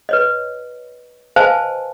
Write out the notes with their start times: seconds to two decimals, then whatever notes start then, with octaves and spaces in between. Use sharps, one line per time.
0.09 B4 C#5 D#5
1.36 B4 C5 D#5 F5 G#5 A5